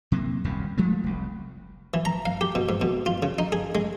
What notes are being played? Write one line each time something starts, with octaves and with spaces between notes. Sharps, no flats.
C3 F#3 A#3
D#1 C2 F#2 C#3
F3 G#3 A3
F1 C2
E3
A#5
F5
G4
B2
G#2
B2
F4
C#3
D#4
G#4
G#3